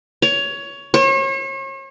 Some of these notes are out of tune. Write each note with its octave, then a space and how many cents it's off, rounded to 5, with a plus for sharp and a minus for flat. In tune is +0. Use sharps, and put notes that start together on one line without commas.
C#5 +15
C#5 -40